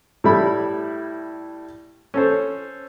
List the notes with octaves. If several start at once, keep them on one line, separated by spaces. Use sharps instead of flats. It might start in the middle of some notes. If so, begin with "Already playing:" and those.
A2 G3 E4 B5
C#4 A4 C5